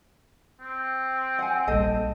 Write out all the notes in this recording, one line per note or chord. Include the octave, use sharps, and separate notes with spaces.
C4
F#5 G#5
A#1 G3 A4 D#5